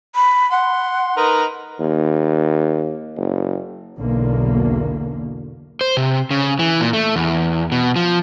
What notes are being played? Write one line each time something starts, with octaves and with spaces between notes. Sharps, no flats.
B5
F#5 C6
D#4 A#4 B4
D#2
F#1
B1 E2 B2 D3 A#3
C5
C3
C#3
E3
A#2
A3
E2
B2
F3